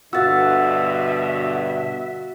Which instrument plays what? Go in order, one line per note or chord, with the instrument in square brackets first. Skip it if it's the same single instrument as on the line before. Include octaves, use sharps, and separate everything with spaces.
[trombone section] G2 B2 D3 [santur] F#4 F5 [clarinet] E5 [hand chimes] E6 A6